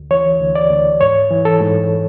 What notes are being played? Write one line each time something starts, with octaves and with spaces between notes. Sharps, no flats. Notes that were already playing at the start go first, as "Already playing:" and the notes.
Already playing: D2
E3 C#5
D2
D5
D2
G#2 C#5
E3
A4
G#2